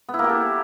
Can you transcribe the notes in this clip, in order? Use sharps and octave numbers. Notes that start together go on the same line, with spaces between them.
B3
E4
A#3
G4
A4